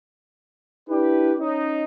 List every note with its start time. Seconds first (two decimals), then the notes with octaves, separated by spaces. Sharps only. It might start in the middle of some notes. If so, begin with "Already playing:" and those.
0.89 D4 E4 G4 B4
1.39 C#4 D#4